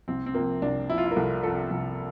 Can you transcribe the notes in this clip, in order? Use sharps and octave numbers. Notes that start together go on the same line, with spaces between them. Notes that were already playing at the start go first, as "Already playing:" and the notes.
C2 C4
C4
C3 F3 A#3
C2 D4
C3 F3 E4
F4
E4
A#4
C2 A4
C3 F3 A4
C2